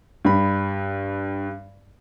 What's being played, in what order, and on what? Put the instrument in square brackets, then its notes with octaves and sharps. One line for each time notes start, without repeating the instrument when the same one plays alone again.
[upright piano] G2 B5